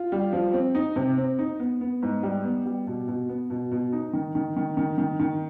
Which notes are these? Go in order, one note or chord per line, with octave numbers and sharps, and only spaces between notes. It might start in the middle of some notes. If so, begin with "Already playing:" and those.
Already playing: F4
G3
F3
C4
D#4
C3
C4
D#4
B3
B3
G#2
G3
B3
G3
B2
B2
B3
B2
B2
D#4
D#3
D#3
D#3
D#3
D#3
D#3